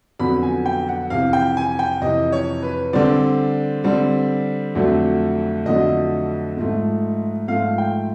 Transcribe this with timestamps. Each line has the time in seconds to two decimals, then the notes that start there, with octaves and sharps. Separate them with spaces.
0.19 F2 D3 F#3 B3 B5
0.43 G#5
0.66 G5
0.89 F#5
1.10 F2 C3 E3 F5
1.33 G5
1.57 G#5
1.79 G5
2.02 F2 C3 E3 D#5
2.32 C#5
2.63 B4
2.93 D3 G3 C4 D5
3.84 D3 G3 C4
4.75 F2 D3 F#3 A3
5.66 F2 D3 F#3 A3 D#5
6.57 G#2 F3 A3
7.48 G#2 F3 A3 F5
7.78 G5